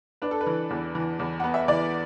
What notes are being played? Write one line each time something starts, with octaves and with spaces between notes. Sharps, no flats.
D4 B4
A4
B4
E3
E2
E3
E2
B3 F#5
E5
E3 D5